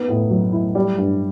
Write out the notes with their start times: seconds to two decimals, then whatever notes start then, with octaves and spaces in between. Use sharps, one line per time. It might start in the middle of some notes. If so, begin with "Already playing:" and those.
Already playing: B3 D#4
0.08 A2
0.30 F#3
0.52 E4
0.75 G3
0.98 G2